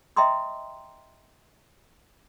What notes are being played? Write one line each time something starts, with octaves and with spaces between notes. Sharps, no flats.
D#5 E5 G5 A#5 C6 D#6